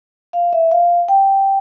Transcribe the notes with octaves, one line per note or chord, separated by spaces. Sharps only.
F5
E5
F5
G5